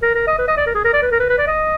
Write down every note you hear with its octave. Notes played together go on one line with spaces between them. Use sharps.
A#4
A#4
D#5
B4
D#5
D5
A#4
G#4
A#4
D5
B4
A#4
B4
B4
D5
D#5